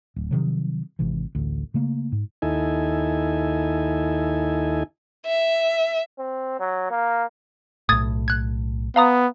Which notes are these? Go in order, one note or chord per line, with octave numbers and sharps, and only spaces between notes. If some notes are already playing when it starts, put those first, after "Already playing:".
D1
C3 D#3 F3 F#3
G#1 C3 E3
A1 D2
C#3 A3 A#3
G#2
D#2 D#4 E4 A4 G#5
E5
C4
F#3
A#3
B1 A2 D#6 G#6 A6
F#6 G#6
B3 F5 A#5 D#6